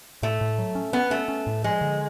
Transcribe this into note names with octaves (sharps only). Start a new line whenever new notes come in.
A2 A3
A2
F#3
C#4
B3 C#4
A3 C#4
C#4
A2
F3 G#3
D3